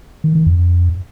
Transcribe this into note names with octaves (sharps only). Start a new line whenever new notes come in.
D#3
D#3
F2